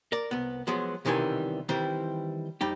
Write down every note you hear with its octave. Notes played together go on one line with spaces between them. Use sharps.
A#4 D5
C2 B3
F3 F#3 G#3 B3
B1 C3 D#3 E3 G3 G#5
D#3 E3 G3 C4 E4 C5
F2 G3 D#4 G4